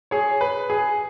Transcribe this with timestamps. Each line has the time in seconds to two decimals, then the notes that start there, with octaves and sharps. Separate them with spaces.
0.11 G#4 C#5
0.41 B4
0.70 G#4